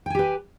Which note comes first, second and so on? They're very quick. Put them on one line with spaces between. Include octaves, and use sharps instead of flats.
G5 G#5 G4 B4